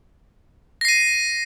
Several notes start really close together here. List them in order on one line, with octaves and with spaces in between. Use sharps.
A#6 C7 D#7